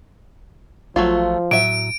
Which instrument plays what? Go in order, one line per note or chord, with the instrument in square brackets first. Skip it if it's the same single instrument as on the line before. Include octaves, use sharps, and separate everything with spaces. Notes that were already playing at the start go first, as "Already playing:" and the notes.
[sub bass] A1 [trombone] F3 [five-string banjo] F#3 A3 F4
[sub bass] A2 [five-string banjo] F#3 E5 [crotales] D7